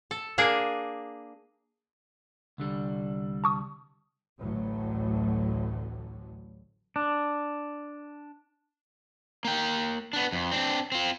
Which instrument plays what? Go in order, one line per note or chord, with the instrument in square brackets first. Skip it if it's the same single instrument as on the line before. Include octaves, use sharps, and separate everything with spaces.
[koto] A4
A#3 D4 G#4
[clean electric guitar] C2 D3 G3
[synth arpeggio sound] A5 C#6 D#6
[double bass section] A1 D2 A2 D3 F#3
[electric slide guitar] D4
[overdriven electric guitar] A#3 G5
B3 D4
F2
C4 D4
C4 F4